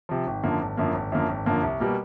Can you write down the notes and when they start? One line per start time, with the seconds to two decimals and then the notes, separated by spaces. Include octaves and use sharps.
0.09 C3 F3
0.27 G#1
0.43 F#2 D3 F3 A#3
0.61 G#1
0.77 F#2 D3 F3 A#3
0.95 G#1
1.12 F#2 D3 F3 A#3
1.29 G#1
1.46 F#2 D3 F3 A#3
1.63 C2
1.80 B2 G3 A#3